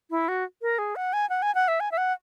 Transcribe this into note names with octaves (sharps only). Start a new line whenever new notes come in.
E4
F#4
A#4
G#4
F#5
G#5
F#5
G#5
F#5
E5
G#5
E5
F#5